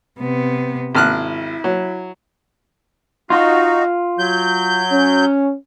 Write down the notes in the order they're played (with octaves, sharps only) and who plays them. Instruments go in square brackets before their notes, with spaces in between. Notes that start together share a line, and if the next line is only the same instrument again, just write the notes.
[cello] C3 B3
[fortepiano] G#1 F6 F#6 [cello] E4
[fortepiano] F#3
[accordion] D#4 F#4 [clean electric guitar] F4
[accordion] F#3 G6
[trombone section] C#4